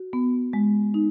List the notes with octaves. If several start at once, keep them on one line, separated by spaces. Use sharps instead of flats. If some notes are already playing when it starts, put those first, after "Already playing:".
Already playing: F#4
B3
G#3
D#4